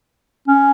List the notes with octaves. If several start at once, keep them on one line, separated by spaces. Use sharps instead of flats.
C#4